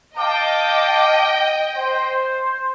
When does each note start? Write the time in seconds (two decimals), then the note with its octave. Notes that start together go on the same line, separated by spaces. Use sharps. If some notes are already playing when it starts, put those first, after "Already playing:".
0.16 D#5 F5 G5 A5 D6
1.76 C5